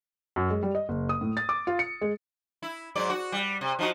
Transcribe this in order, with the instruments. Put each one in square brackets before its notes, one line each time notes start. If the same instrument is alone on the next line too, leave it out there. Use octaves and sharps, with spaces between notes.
[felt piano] F#2
G#3
G3
D#5
F#1
D#6
A2
A6
D6
F4
C#7
G#3
[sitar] E4
G#2 F#3 D5
F#4
G3
C3
F3 D#4 F#4